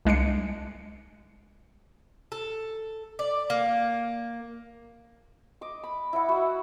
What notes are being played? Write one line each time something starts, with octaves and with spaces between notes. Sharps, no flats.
C2 G#3 D4 C7 C#7
A4
D5
A#3
D#5 D6
B5
E4 D#5 F#5
F#4 E5